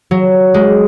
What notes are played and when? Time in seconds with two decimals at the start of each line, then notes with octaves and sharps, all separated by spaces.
0.11 F#3
0.54 G#3